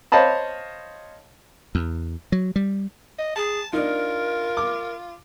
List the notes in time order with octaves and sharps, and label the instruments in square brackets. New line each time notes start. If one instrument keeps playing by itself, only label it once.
[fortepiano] C5 C#5 D#5 F5 A5 B5
[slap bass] E2
F#3
G3
[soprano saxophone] D#5
[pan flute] G#4 [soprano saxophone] A5
[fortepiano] D4 D#4 [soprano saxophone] F4 [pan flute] A#4
[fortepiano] D6